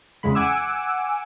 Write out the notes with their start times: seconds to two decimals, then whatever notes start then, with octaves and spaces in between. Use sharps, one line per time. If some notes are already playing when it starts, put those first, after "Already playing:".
0.23 E2 C#3 G#3 B5
0.35 F#5 G#5 D6 E6